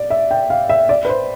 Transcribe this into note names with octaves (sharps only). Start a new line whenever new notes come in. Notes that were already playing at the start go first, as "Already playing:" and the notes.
Already playing: D5
E5
G5
F5
E5
D5
B4
C5